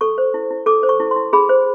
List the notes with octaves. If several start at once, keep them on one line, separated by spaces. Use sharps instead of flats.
A4 C#6
C5
E4
E4
A4 D6
C5
C#6
E4
E4 C6
G#4 B5
C5